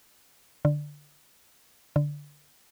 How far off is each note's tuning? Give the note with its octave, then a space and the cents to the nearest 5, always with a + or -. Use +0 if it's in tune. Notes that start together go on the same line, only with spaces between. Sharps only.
D3 +0
D3 -10